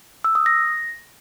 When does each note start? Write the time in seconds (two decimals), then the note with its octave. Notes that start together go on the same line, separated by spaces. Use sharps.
0.24 E6
0.35 D#6
0.46 A#6